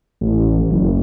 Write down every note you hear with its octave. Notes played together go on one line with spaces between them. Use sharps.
A1
F#1